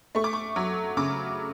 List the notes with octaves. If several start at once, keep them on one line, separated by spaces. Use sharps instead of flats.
A3 C#6
D6
C#6
F#3
C#3 D6